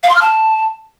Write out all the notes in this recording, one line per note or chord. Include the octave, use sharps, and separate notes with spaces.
F5
C6
F6
A5